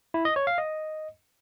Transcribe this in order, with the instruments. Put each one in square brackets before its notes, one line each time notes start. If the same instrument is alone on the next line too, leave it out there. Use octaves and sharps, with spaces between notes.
[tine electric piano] E4
D#5
C#5
F5
D#5